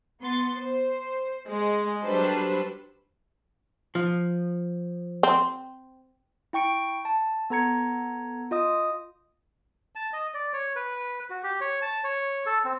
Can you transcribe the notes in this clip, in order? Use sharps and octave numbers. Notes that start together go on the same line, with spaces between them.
B3 C6 A6
C5
G#3
F#3 G3 D4 A4 B4 C5
F3
C4
E4 G5 C#6 C#7 D7
A5
B3 A4 A#5 G#6 C#7
F4 D#5 D#6
A5
D#5
D5
C#5
B4
F#4
G4
C#5
A5
C#5
A4
C4